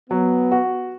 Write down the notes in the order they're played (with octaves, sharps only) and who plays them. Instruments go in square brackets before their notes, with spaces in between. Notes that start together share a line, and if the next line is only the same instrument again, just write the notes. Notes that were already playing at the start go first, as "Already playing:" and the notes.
[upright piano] F#3 [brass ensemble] B3
[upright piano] F#4